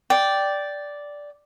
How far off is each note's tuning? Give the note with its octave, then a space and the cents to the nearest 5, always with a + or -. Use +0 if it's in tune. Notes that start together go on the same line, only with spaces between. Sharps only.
D5 -5 G5 -5